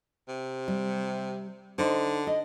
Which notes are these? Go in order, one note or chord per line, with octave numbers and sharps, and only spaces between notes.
C3
G3
D3 D#4 C5
D#5